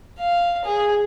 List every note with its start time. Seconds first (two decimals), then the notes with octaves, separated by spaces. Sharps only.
0.18 F5
0.65 G#4